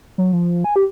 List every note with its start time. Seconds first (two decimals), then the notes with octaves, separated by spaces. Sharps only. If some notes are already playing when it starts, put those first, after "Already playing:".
0.18 F#3
0.33 F3
0.64 G#5
0.76 G4